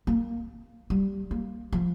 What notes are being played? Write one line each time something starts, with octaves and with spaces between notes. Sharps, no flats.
A#3
G3
A#3
F3